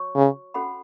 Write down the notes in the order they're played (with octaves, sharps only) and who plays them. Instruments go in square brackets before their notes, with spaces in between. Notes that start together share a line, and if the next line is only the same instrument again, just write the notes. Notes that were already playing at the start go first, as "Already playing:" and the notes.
Already playing: [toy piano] F#4 C#5 C#6
[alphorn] C#3
[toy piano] C#4 F#4 A4 F#5 B5